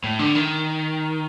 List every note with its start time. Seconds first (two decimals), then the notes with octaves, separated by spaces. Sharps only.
0.04 A2
0.19 D3
0.35 D#3